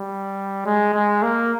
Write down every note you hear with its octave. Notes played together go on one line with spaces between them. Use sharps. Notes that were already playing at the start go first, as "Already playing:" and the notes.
Already playing: G3
G#3
G#3
A#3